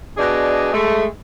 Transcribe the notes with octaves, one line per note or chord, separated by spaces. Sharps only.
B2 D4 G#4 D5 D#5
G#3 A3